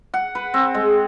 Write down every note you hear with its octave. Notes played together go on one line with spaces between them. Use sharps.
F#5
B4
C4
G#3